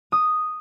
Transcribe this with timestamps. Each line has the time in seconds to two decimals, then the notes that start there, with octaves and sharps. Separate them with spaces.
0.12 D#6